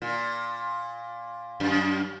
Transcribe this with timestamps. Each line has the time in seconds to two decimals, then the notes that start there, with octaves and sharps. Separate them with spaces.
0.02 A#2
1.60 F#2